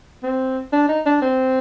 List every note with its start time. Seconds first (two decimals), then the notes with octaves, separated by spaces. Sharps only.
0.23 C4
0.73 D4
0.89 D#4
1.06 D4
1.22 C4